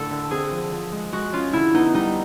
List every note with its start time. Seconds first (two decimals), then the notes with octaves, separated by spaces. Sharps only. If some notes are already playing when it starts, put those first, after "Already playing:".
Already playing: A2 D3 A4
0.11 D3
0.31 C4 G#4
0.51 F3
0.72 F3
0.92 G#3
1.12 G#3 F#4
1.33 C#4 F4
1.53 D3 E4
1.74 B3 D#4
1.94 G3 D#4